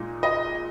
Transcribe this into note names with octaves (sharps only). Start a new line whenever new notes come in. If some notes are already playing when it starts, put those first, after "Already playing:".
Already playing: A#2 G#3 D#4
D#5